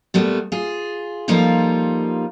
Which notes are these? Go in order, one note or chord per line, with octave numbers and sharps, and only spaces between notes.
A#2 G3 A3 B3
F4 G#4
F3 G3 A#3 D#4 F4 A4